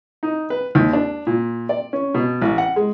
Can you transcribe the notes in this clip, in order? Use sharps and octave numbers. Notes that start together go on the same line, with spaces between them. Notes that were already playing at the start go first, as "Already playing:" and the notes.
D#4
B4
D#2
D4
A#2
D5
C#4
B2
A1
F#5
G#3